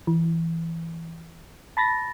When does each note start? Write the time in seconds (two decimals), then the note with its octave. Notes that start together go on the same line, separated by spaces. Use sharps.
0.07 E3
1.77 A5 B5 A6 A#6